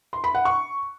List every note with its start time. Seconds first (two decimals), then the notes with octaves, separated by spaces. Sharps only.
0.13 C6
0.24 B5
0.35 F#5
0.45 C#6